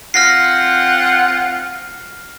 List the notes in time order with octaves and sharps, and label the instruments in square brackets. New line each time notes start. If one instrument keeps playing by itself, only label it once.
[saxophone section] C4 F4 F#5 [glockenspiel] F6 A#6 C7